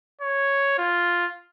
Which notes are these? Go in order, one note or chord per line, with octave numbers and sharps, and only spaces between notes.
C#5
F4